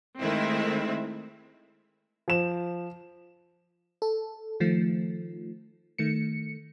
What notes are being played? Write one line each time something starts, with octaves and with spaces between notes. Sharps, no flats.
D#3 G#3 A3 C4 E4
F3 E7
A4
D#3 F3 A3
D#3 A3 C#7